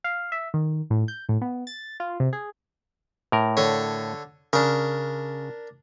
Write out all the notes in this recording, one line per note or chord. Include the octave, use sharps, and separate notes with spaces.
F5
E5
D#3
A2
G6
A2
B3
A6
F4
C3
G#4
A2 A#4
D3 C#5
C#3 D4 A#4